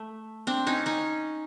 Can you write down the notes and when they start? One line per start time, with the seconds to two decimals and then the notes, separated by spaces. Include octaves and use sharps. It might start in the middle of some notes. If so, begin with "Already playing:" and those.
Already playing: A3
0.47 C4 D4
0.67 C#4 D#4
0.86 C#4 D#4